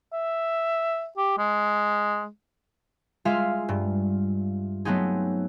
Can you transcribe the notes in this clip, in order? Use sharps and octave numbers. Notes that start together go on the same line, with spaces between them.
E5
G4
G#3
G#3 F4 G#4 E5 F5
G2
F#3 A3 B3 C4 D#4 G#4